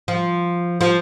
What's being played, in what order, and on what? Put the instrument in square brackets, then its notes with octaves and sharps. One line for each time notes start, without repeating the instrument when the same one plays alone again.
[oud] F3
F3